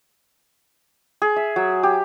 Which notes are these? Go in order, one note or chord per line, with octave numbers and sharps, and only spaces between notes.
G#4
E5
F#3
G4